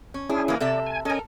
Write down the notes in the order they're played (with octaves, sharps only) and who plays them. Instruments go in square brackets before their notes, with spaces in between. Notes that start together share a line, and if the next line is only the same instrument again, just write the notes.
[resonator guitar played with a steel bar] C#4
[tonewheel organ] C#4 E4 G#4 [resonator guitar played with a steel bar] D4
[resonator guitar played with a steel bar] E3 A#3
[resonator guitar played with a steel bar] C3 A4 E5 [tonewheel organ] D5
[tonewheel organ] G#5
[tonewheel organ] C#4 D#5 G#5 [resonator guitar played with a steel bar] A4 A#4